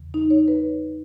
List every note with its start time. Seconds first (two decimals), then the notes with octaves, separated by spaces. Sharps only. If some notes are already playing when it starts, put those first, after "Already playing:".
Already playing: E2 C#3 E3
0.14 D#4
0.30 C#5
0.48 B4